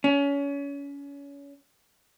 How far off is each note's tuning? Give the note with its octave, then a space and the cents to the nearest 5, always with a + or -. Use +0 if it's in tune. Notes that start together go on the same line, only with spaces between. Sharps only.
C#4 +30